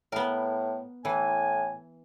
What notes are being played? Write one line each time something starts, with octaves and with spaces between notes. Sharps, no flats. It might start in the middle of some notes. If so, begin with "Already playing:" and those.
A2 B3 A#4
A2 E3 G#5